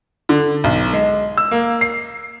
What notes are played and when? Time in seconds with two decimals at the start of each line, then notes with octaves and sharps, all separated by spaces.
0.29 D3
0.64 B1
0.93 G#3
1.37 E6
1.51 A#3
1.81 C7